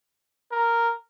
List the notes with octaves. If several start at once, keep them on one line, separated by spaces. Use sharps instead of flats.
A#4